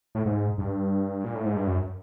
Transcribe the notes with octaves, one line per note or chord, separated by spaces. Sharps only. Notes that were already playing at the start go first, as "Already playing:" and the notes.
A2
G#2
G2
A#2
A2
G#2
G2
F#2